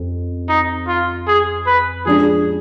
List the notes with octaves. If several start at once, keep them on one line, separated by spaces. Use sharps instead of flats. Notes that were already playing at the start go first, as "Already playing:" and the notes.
Already playing: F2
D#4
F4
G#4
B4
F3 G#3 D4 G#4